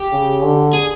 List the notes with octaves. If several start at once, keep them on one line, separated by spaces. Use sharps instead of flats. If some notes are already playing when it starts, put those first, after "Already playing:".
Already playing: G4
C#3
D3
G#4